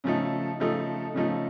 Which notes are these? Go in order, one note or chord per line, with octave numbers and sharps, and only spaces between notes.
C#3 F3 A3 D#4 A4
C#3 F3 A3 D#4 A4
C#3 F3 A3 D#4 A4